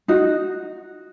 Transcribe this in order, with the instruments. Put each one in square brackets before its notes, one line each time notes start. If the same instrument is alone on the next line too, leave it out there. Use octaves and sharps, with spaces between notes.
[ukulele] D#4 F#4